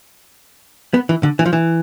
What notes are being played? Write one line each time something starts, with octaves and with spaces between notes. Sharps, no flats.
B3
E3
D3
E3
F3
E3